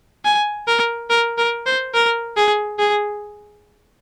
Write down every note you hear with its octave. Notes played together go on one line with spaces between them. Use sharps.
G#5
A#4
A#4
A#4
C5
A#4
G#4
G#4